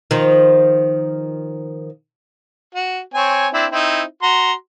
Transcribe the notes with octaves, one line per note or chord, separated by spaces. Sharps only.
D#3 F3
F#4
C4 C#5 G#5
C4 D4 E4
C4 D#4 E4
F#4 A#5 C6